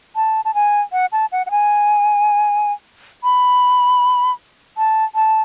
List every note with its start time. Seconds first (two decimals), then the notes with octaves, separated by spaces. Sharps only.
0.16 A5
0.45 A5
0.55 G#5
0.92 F#5
1.12 A5
1.32 F#5
1.46 F#5
1.51 G#5
3.24 B5
4.78 A5
5.15 A5